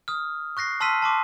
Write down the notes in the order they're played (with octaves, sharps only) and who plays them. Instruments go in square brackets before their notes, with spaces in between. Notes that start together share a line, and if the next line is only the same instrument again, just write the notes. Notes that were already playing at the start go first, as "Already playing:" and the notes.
[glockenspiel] D#6 F6
C#6 F#6 A#6 C7
A5 C6 E6 F6 B6 D#7
A5 C6 D6